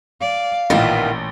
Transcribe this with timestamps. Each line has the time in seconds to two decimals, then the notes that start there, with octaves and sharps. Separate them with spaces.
0.21 D5 F5
0.70 A1 A#2 D#3 E3 B3 F4